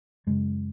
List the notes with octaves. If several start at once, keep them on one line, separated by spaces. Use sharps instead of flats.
F#2 C#3 G#3